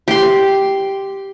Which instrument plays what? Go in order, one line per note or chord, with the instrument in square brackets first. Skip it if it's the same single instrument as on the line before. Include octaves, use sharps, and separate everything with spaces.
[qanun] G4 C6